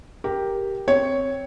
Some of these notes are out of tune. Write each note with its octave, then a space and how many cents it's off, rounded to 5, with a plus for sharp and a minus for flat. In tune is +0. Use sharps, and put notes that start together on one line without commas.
G4 +0 A#4 +0
C4 +0 C#5 +0